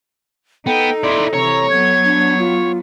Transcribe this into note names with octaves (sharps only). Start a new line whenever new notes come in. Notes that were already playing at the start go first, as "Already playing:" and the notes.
B3 D#4 A4 G5
E4 D5 C6
C3 E3 C#5 A#5
F#3 B3 G#6
D4
F4